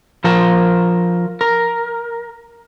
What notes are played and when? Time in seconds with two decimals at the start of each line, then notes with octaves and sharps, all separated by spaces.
0.24 F3 A#4 A5
1.41 A#4